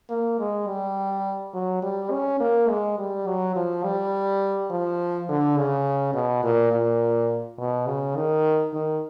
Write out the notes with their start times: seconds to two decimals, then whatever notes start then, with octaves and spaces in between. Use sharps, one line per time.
0.10 A#3
0.39 G#3
0.67 G3
1.54 F#3
1.82 G3
2.11 C#4
2.40 A#3
2.69 G#3
2.98 G3
3.27 F#3
3.56 F3
3.84 G3
4.70 F3
5.29 D3
5.57 C#3
6.14 B2
6.43 A#2
6.73 A#2
7.58 B2
7.87 C#3
8.16 D#3
8.73 D#3